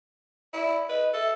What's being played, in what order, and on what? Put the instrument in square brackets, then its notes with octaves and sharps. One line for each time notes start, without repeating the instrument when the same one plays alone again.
[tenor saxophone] E4 [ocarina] D5
[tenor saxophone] B4 [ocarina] D#5
[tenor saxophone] A4 [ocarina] E5